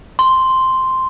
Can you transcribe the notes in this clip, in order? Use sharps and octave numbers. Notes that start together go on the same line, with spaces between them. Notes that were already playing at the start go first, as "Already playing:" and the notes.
C6